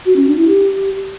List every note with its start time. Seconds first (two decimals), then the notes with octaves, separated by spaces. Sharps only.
0.06 F#4
0.16 C#4
0.27 D4
0.37 E4
0.48 G4